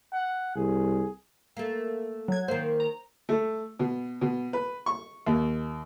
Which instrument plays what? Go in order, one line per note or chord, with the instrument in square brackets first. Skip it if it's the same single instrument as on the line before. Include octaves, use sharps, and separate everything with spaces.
[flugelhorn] F#5
[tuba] C2 [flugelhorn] G#4
[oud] A3 A#3
[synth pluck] F#3 G#6
[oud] D#3 A#3 [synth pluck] C5
[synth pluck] A#5
[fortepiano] A3
B2
B2
B4
C#6
D#2